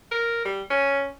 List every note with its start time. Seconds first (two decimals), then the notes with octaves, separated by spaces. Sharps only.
0.11 A#4
0.45 G3
0.71 C#4